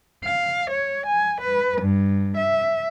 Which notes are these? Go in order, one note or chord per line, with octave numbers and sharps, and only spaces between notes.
F5
C#5
G#5
B4
G2
E5